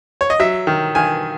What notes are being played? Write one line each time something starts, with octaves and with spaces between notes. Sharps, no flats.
C#5
D#5
F#3 E5
D#3
D#3 G#5